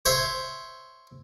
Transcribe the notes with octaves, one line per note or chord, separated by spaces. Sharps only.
C5 C#5 E5